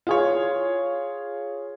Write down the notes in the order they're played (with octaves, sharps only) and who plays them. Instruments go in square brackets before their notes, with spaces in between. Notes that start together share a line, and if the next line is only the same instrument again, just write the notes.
[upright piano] F4 G#4 C#5